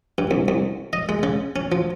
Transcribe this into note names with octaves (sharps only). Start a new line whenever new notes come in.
G2
C2
C2
D#5
G#3
C#3
C#4
F3